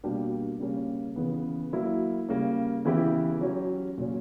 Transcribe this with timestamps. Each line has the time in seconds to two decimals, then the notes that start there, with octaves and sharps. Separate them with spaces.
0.04 B2 G3 A#3 D4 G4
0.60 C#3 G3 A#3 C#4
1.16 C#3 E3 B3
1.73 F#3 A#3 E4
2.29 C#3 G3 A#3
2.85 C#3 E3 B3 E4 G4
3.41 F#3 C#4 G4
3.98 A#2 F#3 C#4